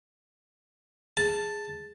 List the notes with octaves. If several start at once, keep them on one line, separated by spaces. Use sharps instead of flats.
G#4 A5